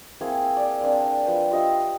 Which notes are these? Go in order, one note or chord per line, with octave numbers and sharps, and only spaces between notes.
A#3 C4 E4 G#4
E6
D5
A#3 C4 D4
F3 B4 G5
F4 G4 D#5 E5